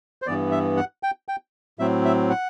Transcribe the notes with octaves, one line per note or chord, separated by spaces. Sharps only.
C5
G2 E3 B3 D5
E5
F#5
G5
G5
A2 F#3 C4 E5
E5
F#5